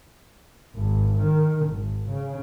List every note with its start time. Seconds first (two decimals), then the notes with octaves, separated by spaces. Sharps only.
0.76 G#1
1.22 D#3
1.67 G#1
2.09 C#3